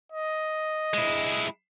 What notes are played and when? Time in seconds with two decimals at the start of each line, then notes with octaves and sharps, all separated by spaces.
0.12 D#5
0.94 G#3 E4